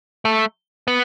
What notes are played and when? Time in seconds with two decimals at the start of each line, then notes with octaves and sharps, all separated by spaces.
0.25 A3
0.88 B3